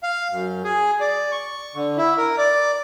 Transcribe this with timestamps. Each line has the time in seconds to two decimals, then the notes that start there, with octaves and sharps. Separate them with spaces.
0.03 F5
0.31 F#2
0.64 G#4
1.00 D5
1.32 C#6
1.75 D3
1.98 E4
2.17 A#4
2.38 D5